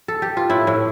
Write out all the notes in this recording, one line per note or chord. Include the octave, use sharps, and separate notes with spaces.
A4
G4
F4
A2 E4
A2